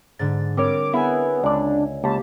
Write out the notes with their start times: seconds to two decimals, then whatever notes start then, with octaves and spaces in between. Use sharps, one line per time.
0.19 G#2 D3 A6
0.57 G3 C4 A#4 C#5 D6
0.94 B3 E4 G#4 E5 G#5
1.44 C#2 D4 D5
2.04 C#2 A#3 G4 A5